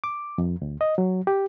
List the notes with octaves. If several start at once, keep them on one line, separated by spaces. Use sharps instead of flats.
D6
F2
D2
D#5
F#3
G4